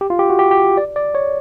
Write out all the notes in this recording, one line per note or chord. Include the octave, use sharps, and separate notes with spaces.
G4
F4
G4
F#4
G4
G4
D5
D5
C#5